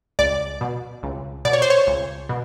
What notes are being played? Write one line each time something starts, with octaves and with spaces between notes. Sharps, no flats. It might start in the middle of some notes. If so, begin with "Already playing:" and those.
C#2 D5
B2
C#2
B2 D5
C#5
C5
C#5
C#2
B2